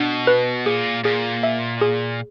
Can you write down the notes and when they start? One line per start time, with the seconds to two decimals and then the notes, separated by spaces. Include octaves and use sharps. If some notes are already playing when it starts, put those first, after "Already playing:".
Already playing: B2 D4
0.27 B4
0.66 A#2 G#4
1.04 A#2 G#4
1.43 E5
1.81 G#4